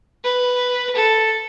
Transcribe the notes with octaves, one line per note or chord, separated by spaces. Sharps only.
B4
A4